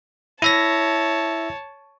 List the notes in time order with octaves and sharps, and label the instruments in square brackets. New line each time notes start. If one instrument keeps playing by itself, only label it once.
[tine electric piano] E4 E5 A#6 [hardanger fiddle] C#5 A5